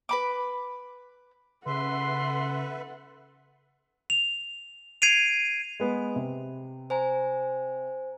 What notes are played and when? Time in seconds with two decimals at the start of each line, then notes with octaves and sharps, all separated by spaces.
0.09 B4 B5 D6
1.66 C#3 A4 B4 E5 F#5 C6
4.10 F7
5.02 G#6 C7 D7 D#7 F7
5.80 G#3 B3
6.16 C3
6.90 C5 G#5 A#5